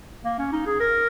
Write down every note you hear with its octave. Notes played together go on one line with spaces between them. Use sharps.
A#3
C#4
D#4
G#4
A#4